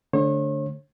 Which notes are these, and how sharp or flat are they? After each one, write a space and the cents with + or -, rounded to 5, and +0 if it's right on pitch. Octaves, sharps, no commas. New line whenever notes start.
D3 -10 A3 -10 C#5 -40